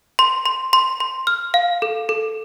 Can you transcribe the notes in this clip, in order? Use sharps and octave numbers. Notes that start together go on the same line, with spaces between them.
C6
C6
C6
C6
F6
F5
A4
A4